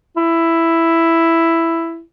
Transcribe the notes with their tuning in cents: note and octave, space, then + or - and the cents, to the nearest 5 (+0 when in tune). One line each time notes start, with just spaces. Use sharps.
E4 +5